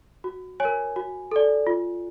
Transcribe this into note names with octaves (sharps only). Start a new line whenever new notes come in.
F#4
C#5 G#5
A#4
F#4
A4 D5
F4